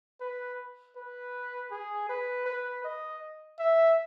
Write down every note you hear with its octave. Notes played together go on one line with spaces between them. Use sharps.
B4
B4
G#4
B4
B4
D#5
E5